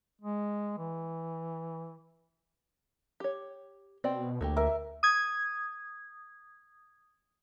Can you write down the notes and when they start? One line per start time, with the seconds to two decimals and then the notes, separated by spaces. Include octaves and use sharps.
0.21 G#3
0.78 E3
3.20 G4 C#5
4.04 B2 C4 D5 G5
4.41 D2 A3 A#3 G4
4.57 A#4 E5
5.03 D#6 G#6